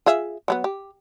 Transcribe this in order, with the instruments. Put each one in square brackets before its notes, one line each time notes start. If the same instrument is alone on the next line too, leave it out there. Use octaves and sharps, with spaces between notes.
[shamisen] F4 G#4 E5
F#3 G3 B3
G4